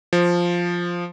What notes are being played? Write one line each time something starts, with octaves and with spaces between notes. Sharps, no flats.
F3